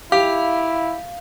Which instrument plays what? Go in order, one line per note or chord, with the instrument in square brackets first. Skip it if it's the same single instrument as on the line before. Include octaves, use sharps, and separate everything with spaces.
[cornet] E4 [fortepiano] G4 [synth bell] F5